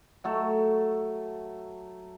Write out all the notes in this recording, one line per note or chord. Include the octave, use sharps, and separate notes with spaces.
F#3 A3 A4